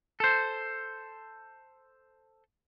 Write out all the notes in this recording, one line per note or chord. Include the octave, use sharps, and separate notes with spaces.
A4 C5